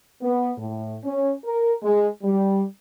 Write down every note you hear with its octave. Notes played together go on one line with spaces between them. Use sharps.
B3
A2
C#4
A#4
G#3
G3